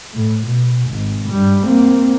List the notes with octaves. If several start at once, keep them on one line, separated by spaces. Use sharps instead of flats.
A2
B2
G#1 G#2
G2 G3
A#3 C4